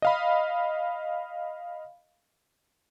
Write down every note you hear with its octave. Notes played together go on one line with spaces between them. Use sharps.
D#5 F5 B5